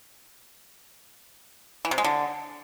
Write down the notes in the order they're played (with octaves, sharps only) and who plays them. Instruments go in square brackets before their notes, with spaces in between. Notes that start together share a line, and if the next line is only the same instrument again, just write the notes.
[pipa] E3
C3
G#3
D3